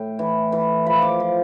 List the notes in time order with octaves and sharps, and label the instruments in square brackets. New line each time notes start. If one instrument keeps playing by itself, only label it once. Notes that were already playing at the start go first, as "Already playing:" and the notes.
Already playing: [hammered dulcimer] A2 G5
E3
E3
F3 B5
D6
F3 C6